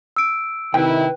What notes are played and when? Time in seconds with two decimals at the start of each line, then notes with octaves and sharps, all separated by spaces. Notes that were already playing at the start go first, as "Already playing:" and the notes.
0.17 E6 D7
0.74 C3 D#3 E4 B4 G5